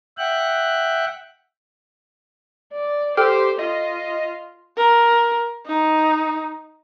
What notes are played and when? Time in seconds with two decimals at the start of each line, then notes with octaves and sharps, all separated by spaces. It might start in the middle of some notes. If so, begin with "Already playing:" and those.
0.18 E5 F#5 G5 F#6
2.72 D5
3.17 G4 A4 C5 G5 F6
3.59 F4 D#5
4.77 A#4
5.66 D#4